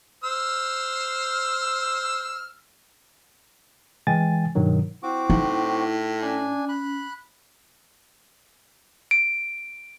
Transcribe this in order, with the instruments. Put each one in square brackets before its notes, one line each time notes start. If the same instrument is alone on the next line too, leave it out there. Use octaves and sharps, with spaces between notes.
[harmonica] C5 E6 F6
[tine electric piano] E3 G#3 G5 G#5 A6
G2 B2 D#3 F#3
[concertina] C4 F#4 D6 [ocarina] E4
[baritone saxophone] A2 [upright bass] D#4
[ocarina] C#4 [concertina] D4 G#5
[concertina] B5 F#6
[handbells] D7